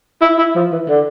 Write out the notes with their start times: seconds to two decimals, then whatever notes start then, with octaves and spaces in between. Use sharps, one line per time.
0.21 E4
0.38 E4
0.55 F3
0.72 E3
0.89 D3